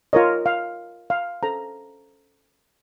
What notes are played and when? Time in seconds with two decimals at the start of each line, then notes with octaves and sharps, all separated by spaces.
0.13 F4 A#4 C#5 D#5
0.46 F5
1.10 F5
1.43 C#4 A4 C5 A#5